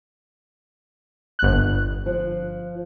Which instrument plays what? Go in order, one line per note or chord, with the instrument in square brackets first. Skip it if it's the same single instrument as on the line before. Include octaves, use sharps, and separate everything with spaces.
[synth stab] G1 F#6
[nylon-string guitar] F3